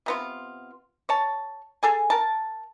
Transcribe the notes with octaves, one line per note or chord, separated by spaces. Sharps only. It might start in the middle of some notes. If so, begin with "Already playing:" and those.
C3 B3 F4
C#5 A5
G#4 A4 G#5
A#4 A5